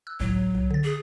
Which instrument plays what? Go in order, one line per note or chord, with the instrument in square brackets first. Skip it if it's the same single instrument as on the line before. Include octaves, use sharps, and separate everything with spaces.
[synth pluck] E6 F#6
[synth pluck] G#1 C#2 A2 [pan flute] F#3
[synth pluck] C2
D3 A6
[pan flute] G#4